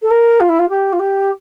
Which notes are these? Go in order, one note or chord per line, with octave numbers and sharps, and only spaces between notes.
A4
A#4
F4
E4
F4
G4
F4
G4